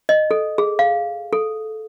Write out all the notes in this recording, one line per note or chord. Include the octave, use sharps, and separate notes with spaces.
D#5
A4
G#4
F5
A4